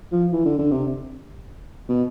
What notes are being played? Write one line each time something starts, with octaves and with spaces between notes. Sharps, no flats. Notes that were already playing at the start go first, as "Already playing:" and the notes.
F3
E3
D3
D3
C3
B2